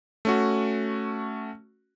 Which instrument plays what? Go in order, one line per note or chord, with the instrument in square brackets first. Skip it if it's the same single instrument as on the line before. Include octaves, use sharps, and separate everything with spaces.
[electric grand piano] A3 C#4 F#4